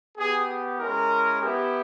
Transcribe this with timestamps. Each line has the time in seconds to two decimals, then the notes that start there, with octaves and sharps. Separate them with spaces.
0.17 B3 G4 G#4
0.79 G#3 C#4 E4 A#4
1.41 B3 E4 G4